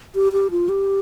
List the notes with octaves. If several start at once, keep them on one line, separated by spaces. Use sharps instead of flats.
G4
G4
F4
G4